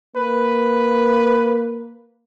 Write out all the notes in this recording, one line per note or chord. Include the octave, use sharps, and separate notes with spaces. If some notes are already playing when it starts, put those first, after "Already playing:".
A#3 B4